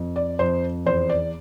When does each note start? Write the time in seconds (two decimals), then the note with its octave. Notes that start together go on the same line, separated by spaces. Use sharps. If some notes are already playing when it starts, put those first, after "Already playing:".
Already playing: F2
0.16 D5
0.39 F2 C5
0.86 E2 C5
1.09 D5